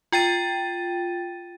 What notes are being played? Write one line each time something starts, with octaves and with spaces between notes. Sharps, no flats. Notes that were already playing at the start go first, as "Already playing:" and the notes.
F4 G5 A6 D#7